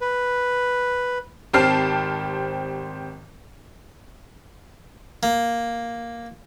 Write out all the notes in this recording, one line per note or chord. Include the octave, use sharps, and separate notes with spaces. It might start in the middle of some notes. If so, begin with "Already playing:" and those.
B4
G#1 C4 G4 A5 F6 C7
A#3